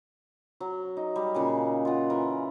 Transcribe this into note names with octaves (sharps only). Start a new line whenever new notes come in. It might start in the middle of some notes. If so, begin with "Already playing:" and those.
F#3
D#4
G3
A#2 C#3 G#5
F4 F#5
E3 A#4